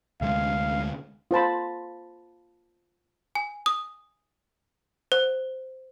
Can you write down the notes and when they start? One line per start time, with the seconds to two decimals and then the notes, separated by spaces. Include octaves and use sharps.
0.21 D2 C3 G#3 F5
1.31 F4 C5 A5 B5
3.35 G#5
3.66 D#6
5.12 C5